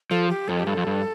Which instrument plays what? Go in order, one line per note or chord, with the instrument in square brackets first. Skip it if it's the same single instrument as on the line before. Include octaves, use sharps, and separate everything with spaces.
[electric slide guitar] F3 [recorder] A4
[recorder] G4
[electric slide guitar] F2 [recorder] A4
[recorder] G4
[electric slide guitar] G2 [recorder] A4
[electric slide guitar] F2
G2